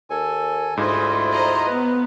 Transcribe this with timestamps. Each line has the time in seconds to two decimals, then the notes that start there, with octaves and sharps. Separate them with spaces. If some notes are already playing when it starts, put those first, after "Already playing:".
0.10 D#2 A4 G#5
0.77 D2 G#2 E4 F4 D#5
1.30 C5 D#5 A#5
1.67 B3 B4